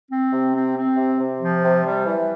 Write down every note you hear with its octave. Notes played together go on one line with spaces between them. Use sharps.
C4
C3
C4
C4
C3
C3
F3
C3
G3
E3